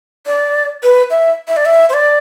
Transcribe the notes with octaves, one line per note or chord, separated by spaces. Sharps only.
D5
B4
E5
E5
D5
E5
C5
D5